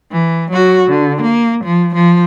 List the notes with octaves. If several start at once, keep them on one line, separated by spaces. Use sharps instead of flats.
E3
F#3 F#4
D3
A#3
F3
F3